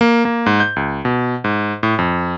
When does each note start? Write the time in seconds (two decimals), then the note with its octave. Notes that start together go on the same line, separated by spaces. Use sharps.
0.01 A#3
0.25 A#3
0.46 G#2
0.60 G6
0.76 C#2
1.05 B2
1.44 G#2
1.83 A2
1.99 F2